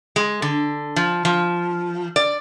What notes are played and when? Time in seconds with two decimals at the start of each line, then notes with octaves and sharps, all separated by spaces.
0.16 G#3
0.42 D3
0.96 F3
1.25 F3
2.16 D5